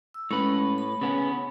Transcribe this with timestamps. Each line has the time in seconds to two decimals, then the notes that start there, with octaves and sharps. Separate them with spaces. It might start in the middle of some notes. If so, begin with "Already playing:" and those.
0.14 E6
0.31 A2 G#3 C#4 B4
0.78 B5
1.01 C#3 B3 C#4